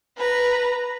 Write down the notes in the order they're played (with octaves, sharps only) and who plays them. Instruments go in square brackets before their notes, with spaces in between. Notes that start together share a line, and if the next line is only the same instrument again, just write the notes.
[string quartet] B4 A#5